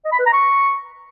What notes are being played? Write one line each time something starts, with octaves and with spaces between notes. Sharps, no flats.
D#5
B5
B4
A#5
C#6